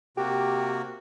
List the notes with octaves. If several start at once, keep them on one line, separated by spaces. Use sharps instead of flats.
C3 A#3 F#4 G4